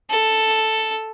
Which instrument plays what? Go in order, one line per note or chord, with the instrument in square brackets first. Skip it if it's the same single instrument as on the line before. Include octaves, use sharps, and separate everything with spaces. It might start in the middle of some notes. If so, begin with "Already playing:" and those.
[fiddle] A4